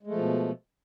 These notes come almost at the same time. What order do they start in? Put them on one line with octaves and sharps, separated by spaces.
G#3 A3 F3 B2